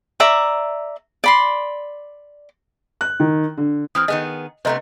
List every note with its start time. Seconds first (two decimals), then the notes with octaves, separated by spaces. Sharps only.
0.20 D5 E5 A#5 C#6
1.24 D5 B5 C6
3.01 F#6
3.20 D#3
3.57 D3
3.95 E3 C4 D#6 F6
4.08 D#3 B3 G#4 D#5
4.65 C3 A3 B3 B4 D#5 A#5